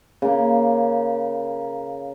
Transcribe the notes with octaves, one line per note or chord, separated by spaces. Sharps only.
C#3 A#3